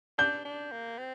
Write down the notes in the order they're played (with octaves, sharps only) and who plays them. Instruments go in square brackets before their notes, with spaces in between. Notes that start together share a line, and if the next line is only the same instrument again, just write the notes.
[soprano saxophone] D4 [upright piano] G6
[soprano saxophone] D4
A#3
C4